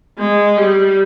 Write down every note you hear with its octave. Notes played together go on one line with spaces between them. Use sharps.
G#3
G3